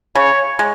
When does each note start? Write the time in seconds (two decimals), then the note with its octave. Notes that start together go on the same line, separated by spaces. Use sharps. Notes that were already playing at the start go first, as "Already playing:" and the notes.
0.15 C#3 C#5
0.59 G#3